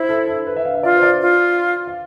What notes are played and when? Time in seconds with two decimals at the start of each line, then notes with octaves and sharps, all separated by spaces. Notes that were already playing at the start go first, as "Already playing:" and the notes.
Already playing: E4 C5 E5
0.09 A4
0.28 A4
0.47 B4
0.56 E5
0.65 F5
0.74 E5
0.83 F4 D5
0.96 C5
1.03 D5
1.21 F4
1.87 F5